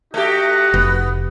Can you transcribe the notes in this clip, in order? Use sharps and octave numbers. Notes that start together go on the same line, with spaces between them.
A3 D#4 F#4 G4 F#5
F1 B3